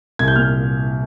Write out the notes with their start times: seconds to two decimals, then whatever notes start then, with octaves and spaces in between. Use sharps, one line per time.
0.19 C2 G#6
0.28 G6
0.36 A#2 F6